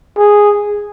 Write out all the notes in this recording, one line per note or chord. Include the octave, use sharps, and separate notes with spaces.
G#4